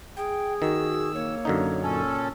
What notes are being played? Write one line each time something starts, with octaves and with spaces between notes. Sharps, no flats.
G#4 G5
D#3 F#4 E6
A#3 C#5
F#2 D3 D#4
A#2 C#4 A4